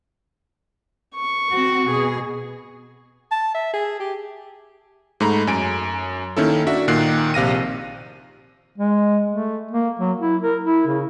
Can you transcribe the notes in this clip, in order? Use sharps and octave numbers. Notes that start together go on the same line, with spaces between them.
C#6
C4 F#4
B2 G#4
A5
E5
G#4
G4
G#2 A3 A#5 B5
F#2 G#5 D7
D#3 A#3 C#4 E4 A4
D4 F#4 E5
A#2 D#3 F#6 C7
A#1 C3 F5 A#6 D#7
G#3
A3
A#3
F#3
E4
A#4
E4
C#3